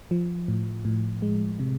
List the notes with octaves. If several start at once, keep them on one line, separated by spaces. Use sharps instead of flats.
F3
A2
A2
G#3
C3